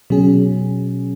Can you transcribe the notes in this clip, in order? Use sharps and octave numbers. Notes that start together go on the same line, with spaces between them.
B2 F#3 C#4 G#4